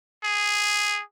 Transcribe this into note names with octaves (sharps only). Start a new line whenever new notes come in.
G#4